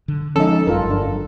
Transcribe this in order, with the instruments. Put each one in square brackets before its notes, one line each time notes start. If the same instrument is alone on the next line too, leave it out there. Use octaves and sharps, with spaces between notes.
[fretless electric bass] D3
[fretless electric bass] F3 G#3 [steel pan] C#4 D#4 [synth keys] A4
[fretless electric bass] G1 F#2 [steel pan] F4 A#4
[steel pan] D4